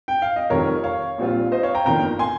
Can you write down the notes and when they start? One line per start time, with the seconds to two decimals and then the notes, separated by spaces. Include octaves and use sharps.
0.08 G5
0.22 F5
0.36 D#5
0.50 F1 F2 D#3 G3 A#4 C#5
0.84 C#5 F5
1.18 A#1 A#2 G3 C4 F4
1.52 C5 D#5
1.63 C#5 F5
1.74 G5 A#5
1.86 G1 F2 D#3 A#3 G5 A#5
2.19 G#5 C6